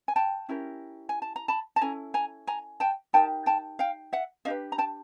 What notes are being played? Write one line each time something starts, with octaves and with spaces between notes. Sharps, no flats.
G#5
G5 A5
C#4 E4 G4 A#4
G#5
A5
A#5
A5 B5
A5
C#4 E4 A4 G#5 A#5
G#5 A#5
G#5 A#5
G5 A5
D#4 G4 A#4 G5 A5
G5 A5
F5 G5
E5 F#5
D4 G4 B4 D#5 F5
A#5
G5 A5